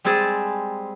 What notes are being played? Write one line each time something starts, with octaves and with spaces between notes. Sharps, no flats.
G3 G#3 C4 G#4 A5